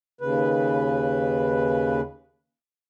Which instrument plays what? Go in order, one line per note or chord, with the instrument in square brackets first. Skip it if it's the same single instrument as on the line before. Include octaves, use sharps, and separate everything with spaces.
[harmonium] D#2 C#3 B4